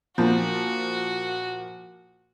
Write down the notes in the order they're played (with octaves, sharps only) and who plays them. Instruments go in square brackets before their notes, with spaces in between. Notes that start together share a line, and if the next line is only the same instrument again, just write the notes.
[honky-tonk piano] A#2 F3 [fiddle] F#4